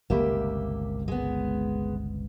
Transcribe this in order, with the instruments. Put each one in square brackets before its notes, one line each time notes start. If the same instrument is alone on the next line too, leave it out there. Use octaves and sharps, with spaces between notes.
[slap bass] G1 C#2 C3 [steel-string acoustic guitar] A#3 G4 E5
[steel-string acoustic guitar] G#3 B3